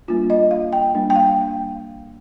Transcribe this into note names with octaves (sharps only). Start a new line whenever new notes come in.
G3 A#3 D4 F4
D#5
F5
G5
G3 A#3 D4
G5
F5